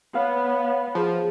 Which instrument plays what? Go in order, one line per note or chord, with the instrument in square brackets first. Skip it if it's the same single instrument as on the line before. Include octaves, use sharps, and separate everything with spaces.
[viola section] B3 [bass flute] C#5 [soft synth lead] F5
[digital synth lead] F3 [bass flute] G#4